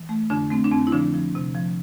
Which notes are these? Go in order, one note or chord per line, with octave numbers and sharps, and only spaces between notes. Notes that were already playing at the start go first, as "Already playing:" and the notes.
Already playing: E3
A3
F2 D3 D4
A3 C4
D4
F2 C4
E4
D3 F3 D4
F3
C3
F3